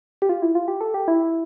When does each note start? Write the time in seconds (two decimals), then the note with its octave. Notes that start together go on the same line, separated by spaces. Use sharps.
0.22 G4
0.29 F4
0.42 E4
0.55 F4
0.68 G4
0.81 A4
0.94 G4
1.08 E4